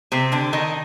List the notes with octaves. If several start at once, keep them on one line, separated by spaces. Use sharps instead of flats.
C3 C4
D3 D4
D#3 D#4